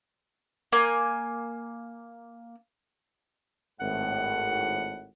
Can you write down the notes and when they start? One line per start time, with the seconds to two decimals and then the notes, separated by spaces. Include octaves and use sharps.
0.72 A#3 G#5
3.80 G#1 A2 F#5